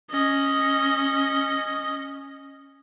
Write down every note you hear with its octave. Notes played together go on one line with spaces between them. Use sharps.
C#4 D#5